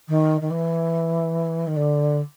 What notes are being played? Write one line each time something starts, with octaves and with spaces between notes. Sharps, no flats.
D#3
D#3
E3
D#3
D3